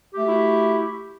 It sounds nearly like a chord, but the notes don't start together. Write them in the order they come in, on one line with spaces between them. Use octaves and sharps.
G4 A3 F#4 E4